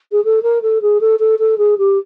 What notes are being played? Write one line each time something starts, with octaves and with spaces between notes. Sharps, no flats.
G#4
A4
A#4
A4
G#4
A4
A4
A4
G#4
G4